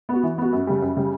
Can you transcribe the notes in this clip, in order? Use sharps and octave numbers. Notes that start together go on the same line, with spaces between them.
B3 F#4
E3
B3 F#4
F#2
C#3 G3
F#2
C#3 G3